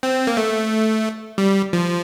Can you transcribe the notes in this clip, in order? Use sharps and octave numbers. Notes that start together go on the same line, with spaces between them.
C4
A#3
A3
G3
F3